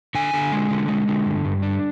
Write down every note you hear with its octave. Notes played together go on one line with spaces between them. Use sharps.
D3 G#5
D3
G#3
D3
G#3
D3
G2
G2
D4